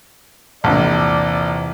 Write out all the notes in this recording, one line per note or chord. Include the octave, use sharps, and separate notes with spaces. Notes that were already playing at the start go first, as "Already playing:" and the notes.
A#1 E2 C3 C4 D5